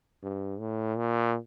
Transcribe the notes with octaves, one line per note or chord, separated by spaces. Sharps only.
G2
A2
A#2